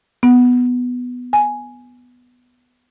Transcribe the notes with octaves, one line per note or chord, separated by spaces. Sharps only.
B3
G#5